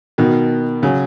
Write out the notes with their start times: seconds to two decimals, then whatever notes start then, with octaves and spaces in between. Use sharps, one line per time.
0.18 B2 D#3
0.82 C#3 F#3